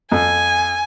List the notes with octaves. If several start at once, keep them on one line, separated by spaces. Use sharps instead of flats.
F2 G#5